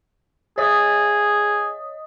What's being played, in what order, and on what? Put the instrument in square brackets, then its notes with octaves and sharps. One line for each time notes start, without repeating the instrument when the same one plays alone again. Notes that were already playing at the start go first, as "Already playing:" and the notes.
[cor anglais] G#4 [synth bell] C#5 D#5 D#6